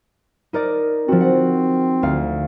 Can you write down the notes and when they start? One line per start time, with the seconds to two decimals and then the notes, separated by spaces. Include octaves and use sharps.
0.53 D#4 A#4 D5
1.08 F3 C4 F#4
1.20 F#5
2.03 D2 F5